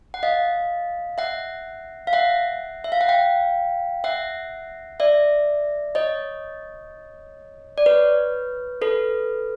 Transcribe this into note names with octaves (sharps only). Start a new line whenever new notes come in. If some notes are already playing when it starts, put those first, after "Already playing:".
F#5
D#5 F5
E5 F#5
F5
E5 F#5
E5
F5
F#5
F5 G5
E5 F#5
D5 E5
C#5 D#5
D5
B4 C#5
A4 B4